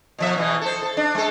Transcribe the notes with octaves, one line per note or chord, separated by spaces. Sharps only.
B2 F3 E5
E2 B2 E3
A4 C5
A4
D4
G#3 A4